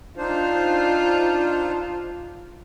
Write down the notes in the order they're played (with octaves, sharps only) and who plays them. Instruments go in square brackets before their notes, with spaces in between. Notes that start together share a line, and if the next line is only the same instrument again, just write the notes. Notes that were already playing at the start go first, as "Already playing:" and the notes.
[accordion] D4 D#4 C5 [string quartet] F4